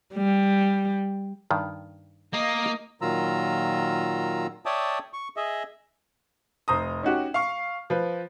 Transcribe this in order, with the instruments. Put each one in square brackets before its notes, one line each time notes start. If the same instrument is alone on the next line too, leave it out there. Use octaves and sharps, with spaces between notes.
[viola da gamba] G3
[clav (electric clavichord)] G2 D#3
[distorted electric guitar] A#3 [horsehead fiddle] D#5
[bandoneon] A#2 D#3 F#3 F4 A#5 E6
C#5 D5 E5 G5 A5 D#6
C#6
G#4 D#5 E5
[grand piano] F1 C5 A#5 D#6
C#4 D#4 F#4 G4
F5 C#6
F3 B4